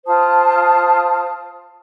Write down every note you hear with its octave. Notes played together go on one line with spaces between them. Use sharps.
F4 C5 A5 D#6